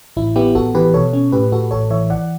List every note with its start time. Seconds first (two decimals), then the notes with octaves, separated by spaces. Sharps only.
0.17 A1 E4
0.36 B3 E4 G4
0.55 A1 F#4 A4
0.75 E3 G4 B4
0.94 B2 A4 C#5
1.13 C#4
1.32 A2 G4 B4
1.52 A2 F#4 A4
1.71 A1 A4 C#5
1.90 E3 C#5 E5
2.10 E3 D5 F#5